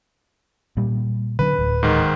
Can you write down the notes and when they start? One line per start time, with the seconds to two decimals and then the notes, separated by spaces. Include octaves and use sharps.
0.77 A#2 G3
1.39 D3 F#3 D4 B4
1.58 D1
1.83 G#2 D#3